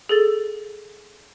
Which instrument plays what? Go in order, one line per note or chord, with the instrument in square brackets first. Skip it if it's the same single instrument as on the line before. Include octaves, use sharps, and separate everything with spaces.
[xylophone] G#4 A4 A6